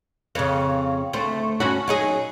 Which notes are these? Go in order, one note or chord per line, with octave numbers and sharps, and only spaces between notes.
F2 C#3
D2 A3 C5
G2 C#4 F#4
F#3 D#4 G#4